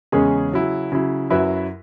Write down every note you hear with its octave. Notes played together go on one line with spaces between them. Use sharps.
E2 C#3 G#3 C#4 G#4
C#3 F#3 E4
C#3 F#3 E4
F#2 F#3 E4 B4 E5